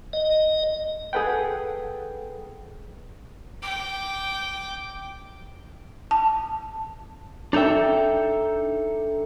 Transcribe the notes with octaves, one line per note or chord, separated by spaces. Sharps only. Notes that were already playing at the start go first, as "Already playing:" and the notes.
D#5
G#4 A4 B4 F#5 G5
G5 D6
A5
D4 D#4 A4 E5 G5